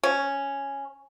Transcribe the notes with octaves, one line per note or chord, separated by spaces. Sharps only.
C#4